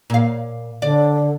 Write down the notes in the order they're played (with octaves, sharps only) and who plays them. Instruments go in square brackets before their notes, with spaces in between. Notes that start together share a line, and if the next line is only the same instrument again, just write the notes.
[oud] A#2 F5
[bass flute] D3 [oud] D5